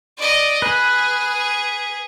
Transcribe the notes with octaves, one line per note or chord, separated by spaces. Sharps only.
D5 D#5
G#4 B4